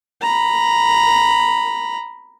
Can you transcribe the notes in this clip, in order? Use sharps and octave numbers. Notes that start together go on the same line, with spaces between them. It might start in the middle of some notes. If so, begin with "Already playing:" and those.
A#5 B5